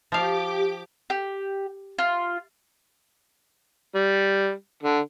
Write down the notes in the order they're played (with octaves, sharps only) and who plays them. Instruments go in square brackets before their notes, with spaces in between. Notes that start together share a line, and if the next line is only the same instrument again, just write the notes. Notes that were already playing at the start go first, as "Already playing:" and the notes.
[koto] F3 F5 [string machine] G4 D6
[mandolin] G4
F4
[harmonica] G3
D3